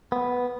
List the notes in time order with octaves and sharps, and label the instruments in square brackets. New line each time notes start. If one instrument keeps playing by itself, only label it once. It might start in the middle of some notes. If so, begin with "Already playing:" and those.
[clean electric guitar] B3